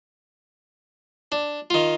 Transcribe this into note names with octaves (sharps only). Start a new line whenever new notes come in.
D4
D#3 F4